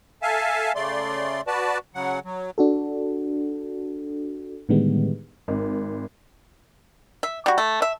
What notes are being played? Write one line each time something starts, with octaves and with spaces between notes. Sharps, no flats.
A4 E5 F5 G#5 A5
C#3 A3 D5 C6
F#4 B4 D5 A5
C#3 F#3 F#5
F#3
D4 F#4 A4
A2 D3 D#3 G3 G#3 B3
G#1
E5
G3 F#4
A3
E5